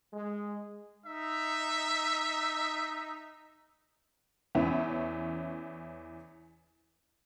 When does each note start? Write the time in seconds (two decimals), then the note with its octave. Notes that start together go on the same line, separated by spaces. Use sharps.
0.13 G#3
1.06 D#4 E5
4.55 E2 E3 C#4 E4